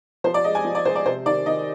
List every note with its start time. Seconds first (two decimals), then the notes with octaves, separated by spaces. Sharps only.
0.24 F3 C5
0.34 D5
0.44 G#3 D#5
0.55 G#5
0.65 F3
0.75 D5
0.85 G#3 C5
0.96 D5
1.06 C3 C5
1.26 D#3 D5
1.46 D#3 D#5